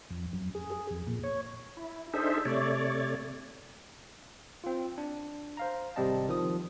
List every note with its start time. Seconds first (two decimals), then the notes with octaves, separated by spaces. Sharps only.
0.10 F2
0.33 F#2
0.55 G#4
0.71 G#4
0.90 F2
1.07 A#2
1.24 C#5
1.77 E4
2.14 D4 D#4 G#4 A4 C5 E5
2.45 C3 A3 C#5 D5
4.64 C4 F4
4.98 D4
5.57 C5 F5 A#5
5.96 G#1 C3 G3 C4 D#5 A5
6.28 D#3 F3 D#6